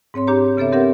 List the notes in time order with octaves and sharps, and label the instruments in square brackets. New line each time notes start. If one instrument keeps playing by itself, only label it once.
[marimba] G#2 C4 C#5 C6
D4 G4 C#5 A#5
C#3 B3 A4 C#5 E5
C4 G4 A#4 E5 F#5